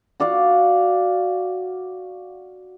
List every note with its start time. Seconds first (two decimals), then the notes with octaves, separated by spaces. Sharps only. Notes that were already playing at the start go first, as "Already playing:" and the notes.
0.20 F#4 D5 F5 F#5